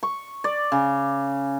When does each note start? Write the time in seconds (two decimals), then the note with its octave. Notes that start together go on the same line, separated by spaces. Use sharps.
0.03 C#6
0.44 D5
0.72 C#3